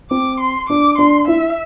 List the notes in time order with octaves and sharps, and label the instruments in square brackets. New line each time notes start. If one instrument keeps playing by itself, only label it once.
[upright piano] C4 [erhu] D6
[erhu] C6
[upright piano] D4 [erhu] D6
[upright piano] D4 [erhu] C6
[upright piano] E4 [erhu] E5